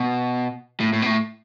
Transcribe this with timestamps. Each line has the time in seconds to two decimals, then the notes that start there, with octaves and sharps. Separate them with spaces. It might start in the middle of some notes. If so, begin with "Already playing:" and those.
Already playing: B2
0.80 A2
0.93 A2
1.02 B2
1.06 A2